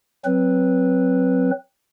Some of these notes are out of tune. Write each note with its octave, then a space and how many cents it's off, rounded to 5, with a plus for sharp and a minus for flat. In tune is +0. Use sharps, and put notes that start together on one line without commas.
F#3 +0 C4 +0 B4 -5